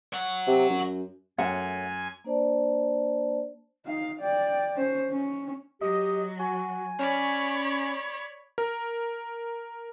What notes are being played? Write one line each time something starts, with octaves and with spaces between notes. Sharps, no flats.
C#5 F#5
C3
F#2
F#2 A3 C#5 F#5 G#5
A#3 D4 C5 D5 A5
D#4 F5
D5 G5
C#4 C5
C#4
F#3 G4 D#5
F#4 G#5
C#4 C#5 D5 B5
A#4